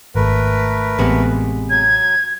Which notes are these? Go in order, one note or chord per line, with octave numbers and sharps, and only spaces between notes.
G#1 A3 A#4 B4
A1 C3 G#3 B3
F#3 G#6